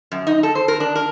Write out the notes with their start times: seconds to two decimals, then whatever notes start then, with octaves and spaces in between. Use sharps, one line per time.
0.12 F#2
0.27 D#4
0.43 A4
0.55 C5
0.68 A#4
0.80 D4
0.95 A#4